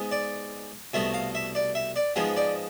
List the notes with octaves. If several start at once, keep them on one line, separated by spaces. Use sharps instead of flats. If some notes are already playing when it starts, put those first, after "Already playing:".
Already playing: G#2 G#3 B3
D5
C2 B2 A3 E5
F5
E5
D5
E5
D5
G#2 F3 G#3 B3
D5